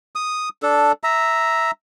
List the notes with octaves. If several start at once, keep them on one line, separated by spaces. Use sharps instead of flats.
D#6
D4 A4
E5 A#5